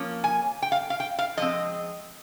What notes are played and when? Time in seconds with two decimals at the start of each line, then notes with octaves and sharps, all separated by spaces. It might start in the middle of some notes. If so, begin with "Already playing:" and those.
Already playing: F3 A#3 C#4
0.24 G#5
0.62 G5
0.72 F5
0.90 F5
1.00 G5
1.19 F5
1.37 F3 G#3 C4 D#5